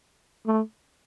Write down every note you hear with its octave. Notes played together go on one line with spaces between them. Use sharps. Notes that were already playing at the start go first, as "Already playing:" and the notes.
A3